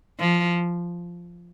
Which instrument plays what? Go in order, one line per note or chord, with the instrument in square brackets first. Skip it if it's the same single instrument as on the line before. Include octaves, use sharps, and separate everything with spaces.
[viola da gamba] F3